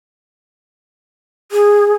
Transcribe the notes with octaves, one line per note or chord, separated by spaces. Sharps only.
G#4